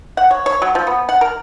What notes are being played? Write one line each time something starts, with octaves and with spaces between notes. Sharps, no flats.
F#5
C#5
C#5
F#3
F3
B3
F#5
A#4